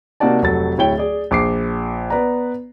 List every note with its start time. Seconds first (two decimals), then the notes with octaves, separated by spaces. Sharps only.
0.20 C3 A#3 D#4 F#4 D5 A5
0.42 F1 F#3 A4 A6
0.78 D1 E4 C#5 G5 G7
0.98 G#4 D5
1.31 A#1 D6 C7
2.10 B3 B4 D5 A#5